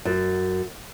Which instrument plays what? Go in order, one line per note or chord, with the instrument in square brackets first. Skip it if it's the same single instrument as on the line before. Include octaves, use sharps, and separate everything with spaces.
[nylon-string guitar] F#2